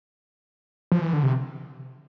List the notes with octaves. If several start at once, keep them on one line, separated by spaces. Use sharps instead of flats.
F3
E3
D3
C3